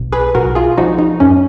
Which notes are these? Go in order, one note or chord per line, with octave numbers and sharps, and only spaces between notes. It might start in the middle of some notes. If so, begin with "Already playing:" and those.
Already playing: B1
G#4 B4
B1 F#4 A#4
F4 G#4
F3 D#4 F#4
D#4
F#2 C#4